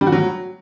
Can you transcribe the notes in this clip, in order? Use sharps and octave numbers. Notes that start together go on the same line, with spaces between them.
G3
F#4
F#3